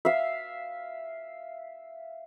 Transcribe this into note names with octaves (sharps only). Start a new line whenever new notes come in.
E5 F5